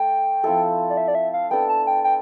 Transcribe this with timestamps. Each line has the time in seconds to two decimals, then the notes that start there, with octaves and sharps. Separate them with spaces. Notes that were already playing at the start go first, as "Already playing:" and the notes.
Already playing: A3 A4 G5
0.44 F3 C4 E4 A4
0.90 D5
0.97 E5
1.08 D5
1.15 E5
1.34 F5
1.51 B3 D4 A4 G5
1.69 A5
1.87 G5
2.04 G5